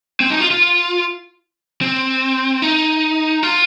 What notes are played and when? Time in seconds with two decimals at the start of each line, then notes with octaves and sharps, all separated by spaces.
0.20 C4
0.30 D#4
0.40 F4
0.51 F4
1.82 C4
2.62 D#4
3.43 F4